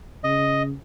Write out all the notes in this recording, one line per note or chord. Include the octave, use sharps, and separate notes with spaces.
C#3 D#5